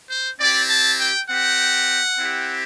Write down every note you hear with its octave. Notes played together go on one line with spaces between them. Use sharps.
C5
C4 E4 G4 D5
A5
G5
C4 G4 F#5
C4 E4 G4